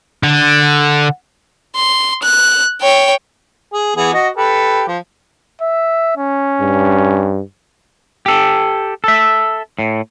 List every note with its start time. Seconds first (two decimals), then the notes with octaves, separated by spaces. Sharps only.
0.23 D3
1.76 C6
2.23 F#6
2.81 C#5 G5
3.73 G#4
3.96 E3 B3 G#4
4.13 F#4 D#5
4.37 G4 A4 B4
4.87 F3
5.62 E5
6.17 C#4
6.61 G2
8.26 G4 A4
9.04 A4 E5
9.79 A2